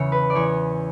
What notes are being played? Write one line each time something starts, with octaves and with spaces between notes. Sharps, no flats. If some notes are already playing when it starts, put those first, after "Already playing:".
Already playing: E2 C#3 C#5 E5
B4
D5
E2 C#5